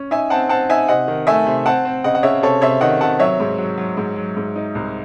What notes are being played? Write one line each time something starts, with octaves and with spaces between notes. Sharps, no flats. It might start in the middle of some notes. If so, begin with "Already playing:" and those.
Already playing: C#4
D#4 E5 G#5
C4 F#5 A5
C4 F#5 A5
D#4 E5 G#5
C3 D#5 F#5
D#3
A3 E5 G#5
C3
C4 F#5 A5
C4
C#3 D#5 F#5
F#5
C#3 C#5 E5
C3 A4 C#5
C3 C#5 E5
D#3 D#5 F#5
C3 F#5 A5
F#3 C#5 E5
G#2
F#3
F#3
G#2
F#3
G#2
D#4
C2